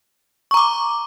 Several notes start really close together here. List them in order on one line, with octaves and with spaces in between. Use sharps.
C#6 A#5 D6